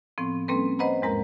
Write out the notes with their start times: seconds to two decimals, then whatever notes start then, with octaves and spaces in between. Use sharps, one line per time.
0.18 A2 F3 B3 C4
0.48 G3 A#3 C4 C#4 A4 B4
0.79 B4 C5 D#5 F#5 A#5 B5
1.02 E2 G#2 G#3 A#4 A#5